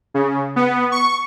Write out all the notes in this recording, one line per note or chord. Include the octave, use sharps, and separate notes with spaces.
C#3
B3
C#6